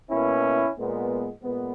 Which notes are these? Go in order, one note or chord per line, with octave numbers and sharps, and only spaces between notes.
B2 A#3 C#4 E4
A#2 G#3 B3
A#2 G#3 B3